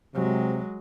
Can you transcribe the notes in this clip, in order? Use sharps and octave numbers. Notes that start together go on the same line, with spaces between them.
C3 F#3 G#3